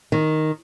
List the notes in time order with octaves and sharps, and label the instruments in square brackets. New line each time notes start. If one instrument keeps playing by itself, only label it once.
[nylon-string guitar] D#3